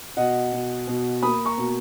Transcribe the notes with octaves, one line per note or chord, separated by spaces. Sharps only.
B2 D#5 F#5
B2
B2
A#3 B5 D#6
A#5 C#6
B2